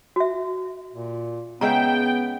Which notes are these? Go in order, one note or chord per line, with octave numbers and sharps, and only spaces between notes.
F#4 E5
A#2
C#3 G#3 B3 E5 G5 A#5